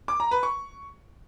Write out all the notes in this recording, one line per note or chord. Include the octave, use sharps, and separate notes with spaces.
D6
A#5
B4
C#6